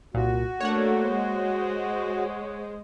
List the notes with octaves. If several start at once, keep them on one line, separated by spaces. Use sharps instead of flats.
C2 A#2 F#4
A3 A#3 D4 C#5 F#5
G#3 C5